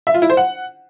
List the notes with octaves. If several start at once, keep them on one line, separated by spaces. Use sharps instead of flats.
E5
F4
E4
C5
F#5